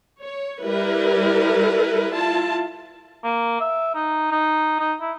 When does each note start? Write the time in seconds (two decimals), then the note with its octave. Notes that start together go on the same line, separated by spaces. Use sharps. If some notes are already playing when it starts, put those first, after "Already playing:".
0.21 C#5
0.64 G3 E4 A#4 B4
2.14 E4 F4 A5
3.24 A#3
3.60 E5
3.95 D#4
4.32 D#4
4.80 D#4
5.01 E4